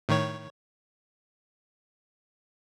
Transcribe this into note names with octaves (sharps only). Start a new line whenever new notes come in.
A2 D#3 C#5